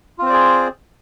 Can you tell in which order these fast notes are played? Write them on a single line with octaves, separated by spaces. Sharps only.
F4 C4 C5 D5 G#4